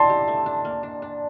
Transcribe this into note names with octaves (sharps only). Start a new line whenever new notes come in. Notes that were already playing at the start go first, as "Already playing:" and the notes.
Already playing: G3 D4 E4 A5 C6
G4
A3
D4
A#3
D4
D4